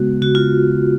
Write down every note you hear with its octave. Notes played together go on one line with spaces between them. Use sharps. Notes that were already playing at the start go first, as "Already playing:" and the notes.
Already playing: C#3 G#3 B3 F#4
C#3 F#4
F4